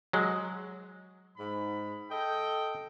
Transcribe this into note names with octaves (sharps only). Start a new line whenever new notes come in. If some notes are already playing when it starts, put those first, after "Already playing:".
F#3 G#3
G#2 B5
A4 D#5 G5